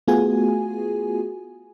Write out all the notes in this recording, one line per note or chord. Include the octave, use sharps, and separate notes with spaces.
A3 B3 F4 F#4 G#4 G#5